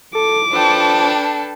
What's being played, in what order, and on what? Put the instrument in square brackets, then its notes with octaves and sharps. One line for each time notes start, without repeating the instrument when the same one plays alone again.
[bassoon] A4 [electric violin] D6
[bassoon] F3 [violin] D4 A4 [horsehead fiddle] B4 G5